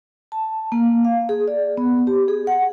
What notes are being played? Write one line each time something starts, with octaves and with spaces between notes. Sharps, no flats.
A5
A#3
F5
G#4
D5
B3
G4
G#4
F#5